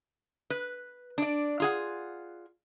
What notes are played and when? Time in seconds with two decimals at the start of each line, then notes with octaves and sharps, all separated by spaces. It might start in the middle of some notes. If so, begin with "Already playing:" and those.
0.50 B4
1.18 D4 D5
1.60 F4 G#4 F#5